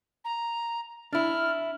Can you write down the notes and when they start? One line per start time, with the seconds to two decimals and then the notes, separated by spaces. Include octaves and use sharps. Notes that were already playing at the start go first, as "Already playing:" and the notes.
0.25 A#5
1.13 D4 E4 F6